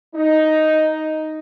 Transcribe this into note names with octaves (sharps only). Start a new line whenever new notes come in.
D#4